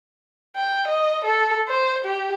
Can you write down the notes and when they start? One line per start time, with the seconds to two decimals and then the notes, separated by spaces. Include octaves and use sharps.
0.56 G5
0.88 D#5
1.25 A4
1.68 C5
2.05 G4